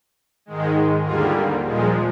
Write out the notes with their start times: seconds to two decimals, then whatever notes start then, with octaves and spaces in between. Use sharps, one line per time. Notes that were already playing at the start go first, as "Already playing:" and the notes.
0.46 G#2 D#3 G#3
1.03 D#2 D3 G3 A#3 F4 G#4
1.62 A#2 F3 G#3